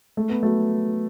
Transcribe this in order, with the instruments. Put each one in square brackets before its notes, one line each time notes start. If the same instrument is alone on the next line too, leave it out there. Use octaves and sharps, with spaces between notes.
[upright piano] A3
B3
F#3 A3